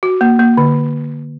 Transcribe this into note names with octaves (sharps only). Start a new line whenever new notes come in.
F#4
A#3
A#3
D3